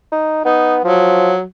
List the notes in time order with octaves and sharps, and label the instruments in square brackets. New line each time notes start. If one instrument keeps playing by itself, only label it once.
[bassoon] D#4
[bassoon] B3 [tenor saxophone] D#4
[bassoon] F3 [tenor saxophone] F#3